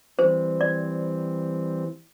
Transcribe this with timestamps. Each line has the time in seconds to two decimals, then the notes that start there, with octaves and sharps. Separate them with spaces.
0.19 E3 G3 C4 C5
0.61 D5